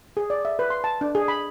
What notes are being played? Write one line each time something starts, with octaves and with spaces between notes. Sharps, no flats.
G#4
D5
E5
B4
C6
A5
D4
G#4
B5